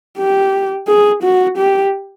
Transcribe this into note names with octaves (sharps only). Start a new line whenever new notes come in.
G4
G#4
F#4
G4